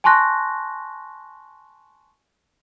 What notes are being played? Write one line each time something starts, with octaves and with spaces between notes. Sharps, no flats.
G#5 A5 C6 C#6 F#6 A#6